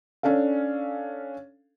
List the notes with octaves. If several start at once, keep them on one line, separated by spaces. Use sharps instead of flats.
C#4 D4 A4 F5